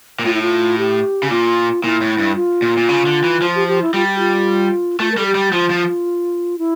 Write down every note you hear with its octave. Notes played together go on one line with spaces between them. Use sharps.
A#2
A2 F4
E4
F4
G4
C#3
A#2 F4
A#2 E4
A2
G2
F4
A#2
A#2
C#3
D3
E3
F3
G4
G4
E4
G3 F4
G4
F4
A3 F4
A#4
G3 A4
G4
G3
F3 F4
F3
E4